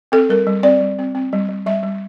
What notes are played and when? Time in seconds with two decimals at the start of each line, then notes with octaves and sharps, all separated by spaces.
0.12 C4 A4
0.29 G3 A#4
0.47 G3
0.63 C4 D5
0.80 G3
0.99 C4
1.15 C4
1.33 G3
1.49 G3
1.66 G3 E5
1.83 G3